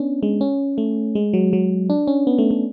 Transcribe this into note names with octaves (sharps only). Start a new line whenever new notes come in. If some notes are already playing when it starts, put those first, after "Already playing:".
Already playing: B3 C#4 D4
G#3
C#4
A3
G#3
F#3
F#3
D4
C#4
B3
A3
A3